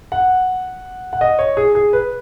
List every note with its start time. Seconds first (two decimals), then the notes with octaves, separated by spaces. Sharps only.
0.12 F#5
1.13 F#5
1.21 D#5
1.39 C#5
1.57 G#4
1.75 G#4
1.93 B4